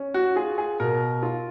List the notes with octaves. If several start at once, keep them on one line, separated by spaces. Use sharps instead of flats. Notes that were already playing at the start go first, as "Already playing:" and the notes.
Already playing: C#4
F#4
F4 G#4
G#4
B2 A#4
F4